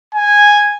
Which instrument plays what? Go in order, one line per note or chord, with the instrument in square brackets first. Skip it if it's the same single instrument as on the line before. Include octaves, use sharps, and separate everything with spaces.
[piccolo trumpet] G#5